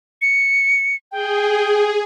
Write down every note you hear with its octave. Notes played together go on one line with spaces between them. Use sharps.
C#7
G#4 G5